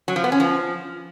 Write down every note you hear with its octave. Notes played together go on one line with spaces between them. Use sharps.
F#3
F3
B3
C#4
F3